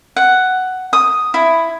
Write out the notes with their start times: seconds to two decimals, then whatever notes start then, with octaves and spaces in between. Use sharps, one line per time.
0.16 F#5
0.93 D#6
1.34 E4